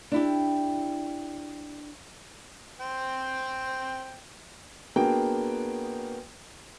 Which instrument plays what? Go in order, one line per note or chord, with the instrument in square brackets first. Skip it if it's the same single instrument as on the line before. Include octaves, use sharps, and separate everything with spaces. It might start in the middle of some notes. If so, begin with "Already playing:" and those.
[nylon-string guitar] D4 E4 G4
[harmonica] C4 G5
[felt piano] A#3 B3 D4 F#4 G#4 G5